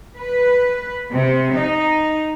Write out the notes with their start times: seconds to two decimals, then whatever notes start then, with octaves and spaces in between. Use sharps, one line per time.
0.19 B4
1.12 C3
1.54 D#4